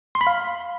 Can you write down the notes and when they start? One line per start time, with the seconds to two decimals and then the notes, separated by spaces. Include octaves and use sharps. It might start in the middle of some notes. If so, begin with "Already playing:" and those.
0.15 C6
0.21 B5
0.27 F5